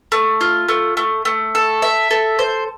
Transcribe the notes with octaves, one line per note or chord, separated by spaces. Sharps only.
A3
F4
A3
A3
A3
A4
E5
A4
C5